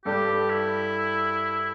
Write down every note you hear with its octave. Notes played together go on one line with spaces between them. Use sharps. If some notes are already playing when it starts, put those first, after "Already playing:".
G2 G3 D4 G4 A4
E4